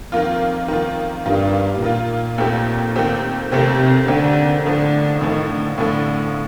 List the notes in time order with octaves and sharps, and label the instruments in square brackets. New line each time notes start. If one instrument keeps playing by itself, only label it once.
[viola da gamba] F2 [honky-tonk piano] D#3 A#3 F4
[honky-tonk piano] D#3 A#3 F4
[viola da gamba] G2 [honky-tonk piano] D#3 A#3 F4
[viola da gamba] A#2 [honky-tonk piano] D#3 A#3 F4
[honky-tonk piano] D#2 D#3 A3 C4 G4
D#2 D#3 A3 C4 G4
[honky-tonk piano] D#2 D#3 A3 C4 G4 [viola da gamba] C3
[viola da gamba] C3
[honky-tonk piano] D#2 D#3 A3 C4 G4 [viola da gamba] D3
[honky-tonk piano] A2 F3 A3 [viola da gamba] D3
[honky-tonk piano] A2 F3 A3 [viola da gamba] D#3
[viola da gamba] D3
[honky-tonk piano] A2 F3 A3 [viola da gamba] D3